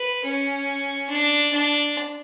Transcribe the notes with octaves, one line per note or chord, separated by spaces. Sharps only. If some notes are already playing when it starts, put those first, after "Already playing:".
Already playing: B4
C#4
D4
D4